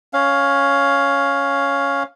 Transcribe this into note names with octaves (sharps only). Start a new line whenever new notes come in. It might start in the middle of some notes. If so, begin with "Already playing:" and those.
C#4 F5